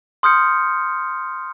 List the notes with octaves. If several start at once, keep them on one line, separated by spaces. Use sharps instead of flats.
C6 D#6 F6 G6 C#7